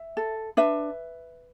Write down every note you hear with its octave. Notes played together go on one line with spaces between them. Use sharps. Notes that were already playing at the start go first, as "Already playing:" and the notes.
Already playing: E5
A4
D4 B4 E5